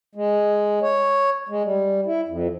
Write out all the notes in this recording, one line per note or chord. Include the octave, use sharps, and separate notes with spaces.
G#3
C#5
G#3
G3
E4
F2